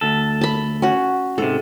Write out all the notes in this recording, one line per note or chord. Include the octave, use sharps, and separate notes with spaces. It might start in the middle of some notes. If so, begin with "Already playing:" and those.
D2 A4
A5 B5
C#4 F#4
G#2 C3 A4